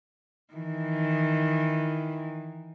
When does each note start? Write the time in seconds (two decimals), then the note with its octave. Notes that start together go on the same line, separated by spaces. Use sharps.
0.53 D#3 E3